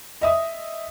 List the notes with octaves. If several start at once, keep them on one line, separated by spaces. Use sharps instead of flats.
D#5 E5 D#6